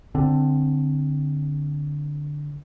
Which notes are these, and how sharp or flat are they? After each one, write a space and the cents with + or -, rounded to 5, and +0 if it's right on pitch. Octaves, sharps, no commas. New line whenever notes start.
D3 +0 C4 +0